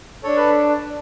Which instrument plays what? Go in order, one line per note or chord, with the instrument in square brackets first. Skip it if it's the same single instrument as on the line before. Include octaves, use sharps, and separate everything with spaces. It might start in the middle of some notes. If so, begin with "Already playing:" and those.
[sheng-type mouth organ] D4 A4 C#5
B4